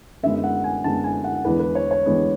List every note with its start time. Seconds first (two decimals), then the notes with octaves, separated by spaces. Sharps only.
0.23 F#2 D3 G#3 B3 E5
0.44 F#5
0.64 G#5
0.84 F#2 D3 G#3 B3 A5
1.04 G#5
1.24 F#5
1.45 E2 D3 G#3 B3 B4
1.59 B4
1.75 C#5
1.91 C#5
2.06 E2 D3 G#3 B3